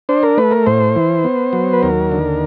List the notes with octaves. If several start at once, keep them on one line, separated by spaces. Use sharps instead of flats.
D4 C5
A#4
A3 B4
A#4
A2 C5
E3
B3
F#3
B4
D#2 A#4
D3